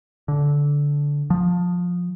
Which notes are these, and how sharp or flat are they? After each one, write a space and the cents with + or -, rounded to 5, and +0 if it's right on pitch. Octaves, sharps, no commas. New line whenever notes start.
D3 -15
F3 +20